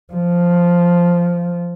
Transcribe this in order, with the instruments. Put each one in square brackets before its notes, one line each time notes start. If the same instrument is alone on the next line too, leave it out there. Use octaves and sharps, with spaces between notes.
[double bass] F3